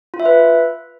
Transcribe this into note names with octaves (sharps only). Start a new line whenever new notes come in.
F4
E5
B4